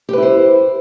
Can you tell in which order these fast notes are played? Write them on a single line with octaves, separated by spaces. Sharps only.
G4 B4 E4 C5